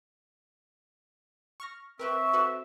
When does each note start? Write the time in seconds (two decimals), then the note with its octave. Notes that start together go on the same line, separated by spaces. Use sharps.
1.60 C#6 F6 A#6
1.99 C4 A#4 B4 E5 G5 C#6
2.33 F#4 A4 B4